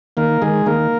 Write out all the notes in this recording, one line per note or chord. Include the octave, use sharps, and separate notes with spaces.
D#3 A#3 A#4
D#3 G#3 G#4
D#3 A#3 A#4